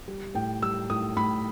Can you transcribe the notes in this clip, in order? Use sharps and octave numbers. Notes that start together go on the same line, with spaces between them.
G3
A2 G5
G3 E6
A2 D#6
A2 B5